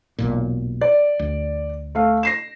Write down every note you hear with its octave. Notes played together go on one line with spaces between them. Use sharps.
E1 B1 A#2
D5
D2
A3 F5
A#6 C7 E7